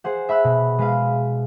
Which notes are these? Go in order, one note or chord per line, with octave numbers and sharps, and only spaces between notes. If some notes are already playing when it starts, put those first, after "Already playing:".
G#4 C5 F#5
E5 B5 E6 F#6
B2
G#3 B4 F5